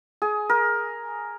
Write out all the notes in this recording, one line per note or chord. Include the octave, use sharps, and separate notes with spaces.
G#4
A#4